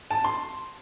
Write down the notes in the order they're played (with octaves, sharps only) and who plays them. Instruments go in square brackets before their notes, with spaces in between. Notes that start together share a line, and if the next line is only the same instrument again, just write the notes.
[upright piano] A5
C6